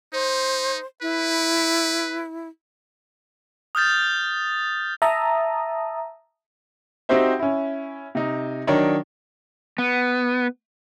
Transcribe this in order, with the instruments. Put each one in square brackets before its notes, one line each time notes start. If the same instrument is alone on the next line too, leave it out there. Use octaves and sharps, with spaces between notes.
[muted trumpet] D#4 [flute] C5
[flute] E4 [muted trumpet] B4
[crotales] D#6 F6 G6 A6
[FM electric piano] E5 A5 A#5 D#6
[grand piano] C4 D#4 F#4 G4 C5 E5
C#4 E4
C3 D#4
D#3 F#3 D4 D#4 C#5
[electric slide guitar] B3